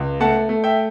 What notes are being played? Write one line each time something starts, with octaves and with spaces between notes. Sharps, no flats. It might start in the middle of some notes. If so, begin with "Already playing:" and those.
Already playing: C#2
A3 F#5 A5
A3
E5 G5